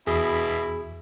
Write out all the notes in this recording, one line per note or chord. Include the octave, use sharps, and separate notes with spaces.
E2 B2 E4 G#4